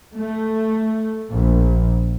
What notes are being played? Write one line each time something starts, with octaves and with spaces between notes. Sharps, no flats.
A3
A#1